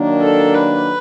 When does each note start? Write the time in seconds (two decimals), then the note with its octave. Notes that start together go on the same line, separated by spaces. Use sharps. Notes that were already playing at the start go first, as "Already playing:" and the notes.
Already playing: D#3 F#3 A#3 D4
0.21 A4
0.54 B4